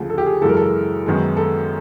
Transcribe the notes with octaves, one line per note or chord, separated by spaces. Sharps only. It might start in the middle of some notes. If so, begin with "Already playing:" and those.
Already playing: D2 C#3 F3
A4
G4
G#4
F#2 C#3 E3 G#3 A4
A#4
A4
F#2 D#3 G#3 B3
A4